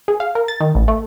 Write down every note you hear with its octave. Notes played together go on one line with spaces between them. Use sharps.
G#4
F5
A#4
A6
D#3
A1
A3